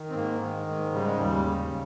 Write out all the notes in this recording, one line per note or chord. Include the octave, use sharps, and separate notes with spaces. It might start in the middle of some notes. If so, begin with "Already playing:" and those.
Already playing: D#3
C4
G#2 A#3
D#3
G#2
C#3 G3
G#3
D#2 G3
C#3